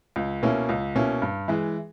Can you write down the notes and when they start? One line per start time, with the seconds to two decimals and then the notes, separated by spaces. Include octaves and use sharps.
0.16 C#2
0.42 B2 A#3 C#4 E4
0.69 C#2
0.95 B2 A#3 C#4 E4
1.22 G2
1.48 E3 G#3